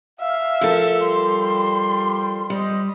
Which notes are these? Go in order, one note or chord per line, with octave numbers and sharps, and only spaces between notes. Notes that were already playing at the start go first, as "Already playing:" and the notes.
E5 F5
F3 A4 A#4
G3 C6
G3 C5 D#5